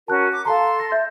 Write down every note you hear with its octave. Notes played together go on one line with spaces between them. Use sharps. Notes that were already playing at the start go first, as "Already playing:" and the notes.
C#4 F#4 A#4 A5 F#6
D6
A4 F5 A5 A#5 C6
A#6
E5 G6 A6